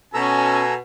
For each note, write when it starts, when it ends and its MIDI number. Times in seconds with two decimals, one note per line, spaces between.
0.14 0.78 47
0.14 0.62 61
0.14 0.74 69
0.14 0.76 80
0.14 0.74 82
0.14 0.74 88